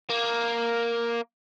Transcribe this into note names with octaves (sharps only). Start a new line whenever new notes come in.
A#3